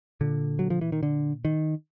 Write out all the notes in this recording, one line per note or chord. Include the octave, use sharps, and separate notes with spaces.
A#2 D3
F#3
F3
E3
D#3
D3
D#3